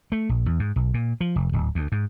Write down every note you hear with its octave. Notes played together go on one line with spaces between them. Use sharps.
A3
A#1
E2
G#2
B1
A#2
F3
F1
D1
D2
G#2